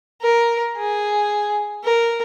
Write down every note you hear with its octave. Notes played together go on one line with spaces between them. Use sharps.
A#4
G#4
A#4